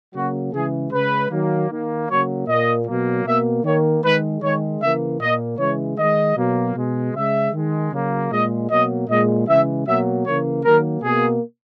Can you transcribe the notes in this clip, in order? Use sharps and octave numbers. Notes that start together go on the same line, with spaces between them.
C#3 F#3 A#3 F#4
C#3 E3 G#3 G#4
C#3 G#3 B4
D#3 F#3 A#3
D#3 A#3
C#3 F#3 A#3 C#5
A#2 A#3 D#5
B2 F#3 A#3
B2 A#3 E5
D#3 A#3 C#5
D#3 G#3 B4
D#3 G#3 C#5
C#3 E3 A#3 E5
A#2 A#3 D#5
C#3 E3 G#3 C#5
D#3 G#3 D#5
B2 F#3 A#3
B2 G#3
C#3 G#3 E5
D#3 G#3
C#3 F#3 A#3
A#2 G#3 D#5
B2 F#3 A#3 D#5
A#2 G#3 D#5
C#3 E3 G#3 E5
B2 F#3 A#3 E5
C#3 E3 A#3 C#5
D#3 F#3 A#3 A#4
B2 A#3 G#4